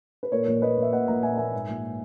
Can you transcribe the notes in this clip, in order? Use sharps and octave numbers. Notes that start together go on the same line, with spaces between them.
B4
A#2 A#4 C#5
A#1
A#2 B4 D#5
A#1 E5
A#2 D#5 F#5
A#1 F#5 A#5
A#2 E5 G#5
A#1 E5 G#5
G#2
A#1